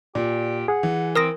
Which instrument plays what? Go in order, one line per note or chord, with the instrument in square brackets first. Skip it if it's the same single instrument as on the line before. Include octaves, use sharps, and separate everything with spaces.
[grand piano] A#2 [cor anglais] G4 [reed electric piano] D5
[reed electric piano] G#4 [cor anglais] F#5
[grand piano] E3
[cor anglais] C4 [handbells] A#4 D#6 A#6